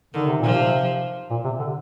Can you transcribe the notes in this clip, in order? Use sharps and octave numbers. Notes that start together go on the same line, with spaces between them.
D3 D#3
C3
A#2 F3
C3
A#2
C3
D3